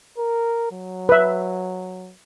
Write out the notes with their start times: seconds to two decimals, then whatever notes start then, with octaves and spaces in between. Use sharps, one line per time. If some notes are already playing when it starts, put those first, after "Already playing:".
0.18 A#4
0.72 F#3
1.09 B4 E5